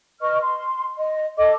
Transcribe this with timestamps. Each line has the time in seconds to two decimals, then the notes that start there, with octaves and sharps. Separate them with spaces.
0.21 B4 D#5 C#6 F6
0.41 C6
0.99 D#5
1.38 A4 D#5 D6